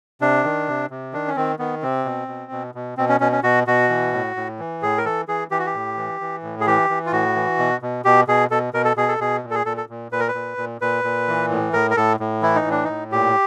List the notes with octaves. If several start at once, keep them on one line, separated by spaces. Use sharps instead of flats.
C3 D4
D#3
C3
C3
D#3 D4
C#4
D#3 C4
D#3 B3
C3 C4
B2
B2
B2
B2
B2 C4
C#4
B2 C#4
C#4
B2 F#4
B2 F#4
E3
A2
A2
E3
A2 G#4
A#4
E3 A4
E3 G#4
E3 G4
F#4
G4
A2
E3
E3
A2
G#4
E3 G4
E3
F4
A2 F#4
E3
B2
B2
B2 G4
B2 G#4
B2 A4
B2 A#4
A4
B2 G#4
A4
B2 G#4
A#2
A4
G#4
A#2 A4
A4
A#2
A#2 B4
A#4
B4
A#2
A#2
A#2 B4
A#2
E3
A2
A2 A#4
A#4
A2 A4
A2
E3 E4
D#4
A2
D4
A2 D#4
A#2 G4